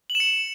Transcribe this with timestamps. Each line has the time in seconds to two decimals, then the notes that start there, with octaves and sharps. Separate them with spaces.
0.10 F#7
0.15 E7
0.20 C#7